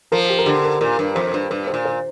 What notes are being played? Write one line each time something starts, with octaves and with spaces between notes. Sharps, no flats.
F3 A#4
G4
A#4
D3 G4
A#4
A#2 A#4
G2
F2 C5
G2
G2 C5
C5
A#2
C5